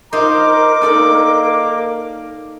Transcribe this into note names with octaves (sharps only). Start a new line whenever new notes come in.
D#4 F4 A#4 C5 A#5 D6
A#3 D#4 A4 D5